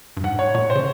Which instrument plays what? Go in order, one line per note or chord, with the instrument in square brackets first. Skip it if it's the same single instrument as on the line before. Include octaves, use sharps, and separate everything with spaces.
[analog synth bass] G2
[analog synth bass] G#2 [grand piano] F#5
[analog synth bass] A2 [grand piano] C#5
[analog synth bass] A#2 [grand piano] C#5
[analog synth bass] B2 [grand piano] C5
[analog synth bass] C#3